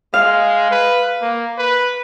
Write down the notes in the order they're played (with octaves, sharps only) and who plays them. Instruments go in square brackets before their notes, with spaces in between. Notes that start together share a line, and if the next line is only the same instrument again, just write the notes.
[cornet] G#3 [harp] F5
[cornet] B4
A#3
B4